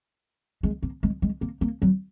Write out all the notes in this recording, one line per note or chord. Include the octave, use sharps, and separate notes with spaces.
G#3
A#3
G#3
G#3
A#3
A#3
F#3